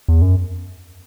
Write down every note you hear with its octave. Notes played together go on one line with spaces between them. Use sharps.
E2
F#2